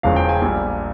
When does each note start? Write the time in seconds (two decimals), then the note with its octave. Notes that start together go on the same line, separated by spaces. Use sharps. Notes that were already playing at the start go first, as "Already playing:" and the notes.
0.03 E1 E2 C#3 F3 G#3 F5
0.16 G5
0.29 G#5
0.42 A#1 A#2 G3